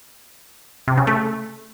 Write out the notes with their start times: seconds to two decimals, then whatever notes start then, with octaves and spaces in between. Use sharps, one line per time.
0.88 C3
0.97 C#3
1.07 A3